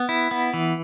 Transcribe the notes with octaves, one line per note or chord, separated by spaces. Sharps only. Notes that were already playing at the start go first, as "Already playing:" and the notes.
Already playing: B3
E4
B3
E3